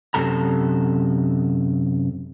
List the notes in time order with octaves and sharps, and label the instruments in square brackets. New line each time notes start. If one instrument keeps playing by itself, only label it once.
[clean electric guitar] F#2 C3 A4 A#5